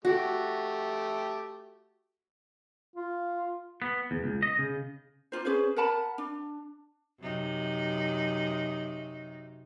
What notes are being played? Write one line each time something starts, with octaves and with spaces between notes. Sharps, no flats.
A3 F#4 G4
F4
B3
E2
C#2
D#5
C#3
D4 D#4 F4 C5
C#4 G#4 B4 C5
A#4 F#5 A5 B5
D4
F#2 C3 D#4